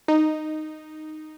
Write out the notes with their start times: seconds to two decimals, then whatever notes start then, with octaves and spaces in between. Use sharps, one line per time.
0.08 D#4